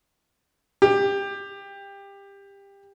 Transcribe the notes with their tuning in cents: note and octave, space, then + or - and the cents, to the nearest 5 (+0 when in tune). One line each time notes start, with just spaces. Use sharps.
G4 +20